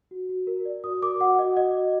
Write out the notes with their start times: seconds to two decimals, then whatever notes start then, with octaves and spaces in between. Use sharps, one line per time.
0.11 F#4
0.29 F#4
0.47 A#4
0.65 D5
0.84 F#4 D#6
1.02 A#4 D6
1.20 F#4 F#5
1.39 F#4 D#5
1.56 F#4 D#5
1.75 F#4